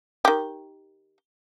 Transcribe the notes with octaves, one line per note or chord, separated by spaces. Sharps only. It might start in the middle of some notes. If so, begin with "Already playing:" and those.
D#3 G4